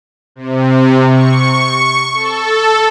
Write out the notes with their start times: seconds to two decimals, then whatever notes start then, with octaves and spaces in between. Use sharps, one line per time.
0.36 C3
1.09 C#6
2.15 A4